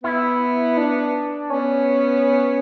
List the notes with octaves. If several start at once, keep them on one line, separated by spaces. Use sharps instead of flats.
B3 E4
D4
B3 C#4